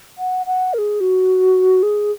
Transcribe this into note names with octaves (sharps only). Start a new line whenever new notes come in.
F#5
F#5
A#4
G#4
F#4
G#4